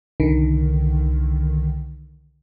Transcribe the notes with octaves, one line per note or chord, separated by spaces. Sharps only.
C2 D3 D#3